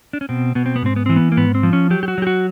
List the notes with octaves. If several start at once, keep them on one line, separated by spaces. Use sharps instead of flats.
D4
C#4
B2 C4
B2 B3
C4
B3
G#2 C4
B3
E3 C4
B3
A#3
G#2 B3
C4
F3
C#4
F#3 G4
G4
F#4
F#3 G4
F#4